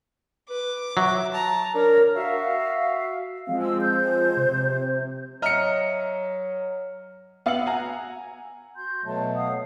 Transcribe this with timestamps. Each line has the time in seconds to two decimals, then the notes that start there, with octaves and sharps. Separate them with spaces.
0.50 B4 D6
0.97 F#3 E5
1.33 A5 A#5
1.74 D4 A#4 C#5
2.16 F#4 E5 F5
3.47 F3 G#3 C4 F5
3.60 E6
3.80 C5 G6
4.37 C3
5.42 F#3 D#5 E5 A#5 F6 C#7
7.46 B3 F5 E6 C#7 F#7
7.66 F#5 G#5 A#5
8.77 F#4 C6 G6
9.04 B2 F#3 A3 A5
9.36 F5 F#5 D#6